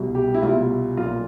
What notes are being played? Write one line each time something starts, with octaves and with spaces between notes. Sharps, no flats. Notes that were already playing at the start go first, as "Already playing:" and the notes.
Already playing: C2 B2 G3
G4
E4
C2 B2 G3 F4
B1 A#2 F#3 F4